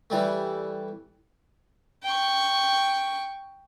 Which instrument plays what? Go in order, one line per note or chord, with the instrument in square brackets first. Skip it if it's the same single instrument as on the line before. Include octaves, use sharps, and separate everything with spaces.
[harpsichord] E3 G3 A3
[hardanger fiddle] G5 C#6